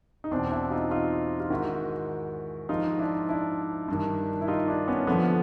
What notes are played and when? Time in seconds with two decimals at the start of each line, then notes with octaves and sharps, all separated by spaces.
0.24 D#4
0.31 E2 B2 C4 D4
0.51 D4 E4
0.71 D#4 F4
0.91 D#4 F4
1.40 F4
1.50 G#2 D#3 E4 F#4
2.69 G#2 F3 D#4 F4
2.99 D4 E4
3.29 D4 E4
3.88 G2 D#3
4.41 E4
4.48 D#4 F4
4.68 D4 E4
4.88 B3 C#4
5.07 F2 D3 F3 A3 B3